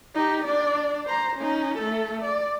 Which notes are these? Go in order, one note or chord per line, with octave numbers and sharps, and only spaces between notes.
D#4 G4
D4 D5
C5 A#5
C#4 D#4
A3 A4
D5